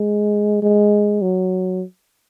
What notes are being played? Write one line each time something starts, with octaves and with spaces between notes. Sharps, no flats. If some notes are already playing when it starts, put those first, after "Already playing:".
Already playing: G#3
G#3
F#3